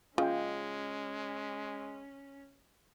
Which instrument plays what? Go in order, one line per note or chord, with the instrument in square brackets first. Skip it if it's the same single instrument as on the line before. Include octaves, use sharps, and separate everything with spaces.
[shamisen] C#3 [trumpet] G#3 [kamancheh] C#4 [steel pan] F4 D#5 G5